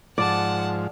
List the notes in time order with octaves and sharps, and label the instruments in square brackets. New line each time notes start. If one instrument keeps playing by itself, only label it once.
[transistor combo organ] G#2 F3 [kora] D5 [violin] F#5 A5